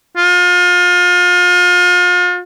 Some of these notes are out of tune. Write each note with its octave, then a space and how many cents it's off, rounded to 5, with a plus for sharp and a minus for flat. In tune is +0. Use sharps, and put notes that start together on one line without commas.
F4 +35